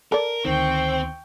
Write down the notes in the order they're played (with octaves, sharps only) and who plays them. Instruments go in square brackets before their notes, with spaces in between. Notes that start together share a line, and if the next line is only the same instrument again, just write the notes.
[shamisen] A4 D5 [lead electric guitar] A#4
[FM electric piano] D2 D#3 [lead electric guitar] C4 [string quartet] G5 C#6